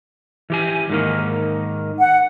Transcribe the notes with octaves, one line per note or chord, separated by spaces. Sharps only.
E3 G4 G#5
G#2 D#3 A#3
F#5